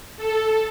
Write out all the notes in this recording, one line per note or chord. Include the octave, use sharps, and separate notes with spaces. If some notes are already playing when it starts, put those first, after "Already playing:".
A4